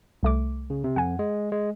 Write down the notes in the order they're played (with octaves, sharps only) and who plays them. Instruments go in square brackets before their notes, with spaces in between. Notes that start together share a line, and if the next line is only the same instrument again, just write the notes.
[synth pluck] C2 A3 D6
[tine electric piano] C#3
C3
[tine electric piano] F2 [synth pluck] F#5 G#5
[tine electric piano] G#3
G#3